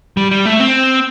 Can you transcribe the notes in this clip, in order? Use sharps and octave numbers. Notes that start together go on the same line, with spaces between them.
G3
G3
A3
C4